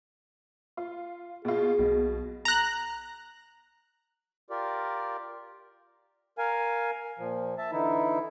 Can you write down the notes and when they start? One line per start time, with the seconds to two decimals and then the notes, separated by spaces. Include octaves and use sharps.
0.77 F4
1.45 B2 F4 G#4
1.79 B1 B2
2.45 A#5 F#6
4.50 F4 G4 A#4 D5
6.38 A#4 F5 G#5
7.19 A#2 F3
7.58 E5 A5
7.72 D3 E3 D#4 E4